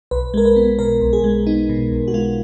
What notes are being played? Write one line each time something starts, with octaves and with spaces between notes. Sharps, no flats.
B1 B4
G#3 A#4
B4
B3
B2 A#4
B1
G#4
G#3
B3 D#4
B2
B1
F#4
G#3 F4